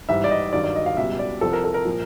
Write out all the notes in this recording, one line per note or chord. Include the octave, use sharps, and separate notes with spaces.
G#2 E3 G3 E5
D5
D#5
G2 D#3 F#3 D5
D5
D#5
F5
C#2 B2 G3 E5
D5
C2 C3 F3 A4
A#4
A4
A#4
A#2 F3